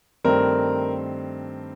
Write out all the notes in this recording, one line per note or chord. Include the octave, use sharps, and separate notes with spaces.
G2 D#3 A3 C4 A#4